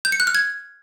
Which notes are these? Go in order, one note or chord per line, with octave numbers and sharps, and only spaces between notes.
G6
C#7
F#6
F6
G#6